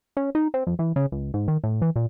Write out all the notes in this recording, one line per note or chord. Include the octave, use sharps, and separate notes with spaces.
C#4
D#4
C4
F2
E3
C#3
C#2
G#2
D#3
A2
E3
A#2